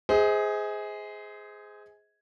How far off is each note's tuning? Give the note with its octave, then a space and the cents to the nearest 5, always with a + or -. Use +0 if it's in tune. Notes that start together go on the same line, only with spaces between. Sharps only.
G#4 +0 C5 -20 D#5 +40